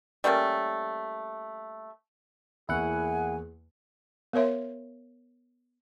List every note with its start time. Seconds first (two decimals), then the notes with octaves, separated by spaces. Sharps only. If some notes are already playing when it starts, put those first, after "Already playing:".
0.24 G3 A3 A#3 C#4
2.69 E2 A#3 E4 G#4 F#5 G#5 C#6
4.33 B3 A#4 C#5 E5 C6